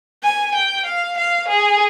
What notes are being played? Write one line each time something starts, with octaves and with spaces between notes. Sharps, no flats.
G#5
G5
F5
F5
G#4